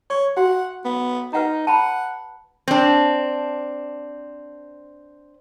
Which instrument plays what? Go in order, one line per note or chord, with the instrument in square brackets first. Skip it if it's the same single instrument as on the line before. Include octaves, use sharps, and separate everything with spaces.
[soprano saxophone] C#5 [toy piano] C#6
[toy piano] F#4 [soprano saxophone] F#5
[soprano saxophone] B3
[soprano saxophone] D#4 [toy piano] B4 F#5 A#5
[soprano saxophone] F#5 [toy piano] A5 B5
[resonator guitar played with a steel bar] C4 D4